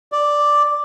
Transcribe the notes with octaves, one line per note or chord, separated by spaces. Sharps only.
D5